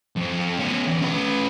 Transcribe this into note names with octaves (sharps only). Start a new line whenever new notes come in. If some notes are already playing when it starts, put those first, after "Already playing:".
F2
B3 C#4
E2
C#4 B4